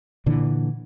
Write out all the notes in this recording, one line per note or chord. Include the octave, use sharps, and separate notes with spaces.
A#2 D3 E3